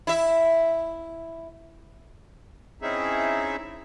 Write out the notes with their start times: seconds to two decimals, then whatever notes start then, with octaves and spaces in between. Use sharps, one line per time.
0.07 E4 E5
2.82 C4 C#4 D#4 E4 G#4 E5